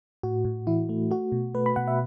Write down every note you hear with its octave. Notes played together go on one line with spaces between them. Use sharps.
A2 F#4
A2
E3 E4
A3
A3 F#4
B2
A3 B4
B5
B2 F#5
E5